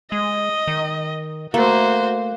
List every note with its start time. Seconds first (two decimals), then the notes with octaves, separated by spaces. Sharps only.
0.12 G#3 D#5
0.67 D#3
1.54 A3 A#3 F#4 C5